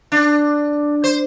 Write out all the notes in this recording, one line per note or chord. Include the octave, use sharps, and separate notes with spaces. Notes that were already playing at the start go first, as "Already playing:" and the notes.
D4
C5